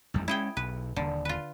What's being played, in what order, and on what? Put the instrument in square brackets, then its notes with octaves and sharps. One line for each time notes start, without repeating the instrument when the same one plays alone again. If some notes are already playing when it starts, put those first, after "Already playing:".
[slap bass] A1 F2 G3
[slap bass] G#3 C#4 [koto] E4 G#4 G5
[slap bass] B1 [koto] B4
[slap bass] D#1 [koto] D3
[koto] F4 B4